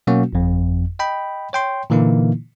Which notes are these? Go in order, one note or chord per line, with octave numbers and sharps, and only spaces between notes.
B2 F#3 A#3 C#4 F#4
G1 F2
D#5 G5 B5
C#5 G5 C6
A#2 D3 E3 A#3 D#4 E4